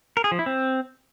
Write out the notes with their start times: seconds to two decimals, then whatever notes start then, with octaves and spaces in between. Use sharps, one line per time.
0.17 A#4
0.24 G#4
0.32 F3
0.39 E4
0.46 C4